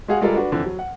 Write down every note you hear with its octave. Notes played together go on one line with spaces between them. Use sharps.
G#3 F#4 G#4 F5 F#5
G3 G#3 F4 A4 A#4 D5
D4 F#4 B4
F2 D3 E3
F#3
F#5